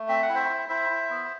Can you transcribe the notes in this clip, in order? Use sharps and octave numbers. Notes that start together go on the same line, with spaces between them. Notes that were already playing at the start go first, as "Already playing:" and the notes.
Already playing: A3
C4 E5
F#5
E4
C5 E5
E4
E4 C5 E5
E4
B3